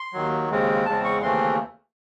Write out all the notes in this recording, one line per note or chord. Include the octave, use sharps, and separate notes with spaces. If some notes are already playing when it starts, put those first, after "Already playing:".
Already playing: C6
D#2 D#3 F#3
D#2 C#3 G#3 C4
E2 C#3 G#3 C4 A5
C#6
D#2 C#3 E3 A3 C4 C6